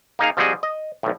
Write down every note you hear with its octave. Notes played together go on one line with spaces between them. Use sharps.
A#3 D#4 G#4 F5
F3 G3 C4 F#4 G#4 D#5
D#5
B1 A2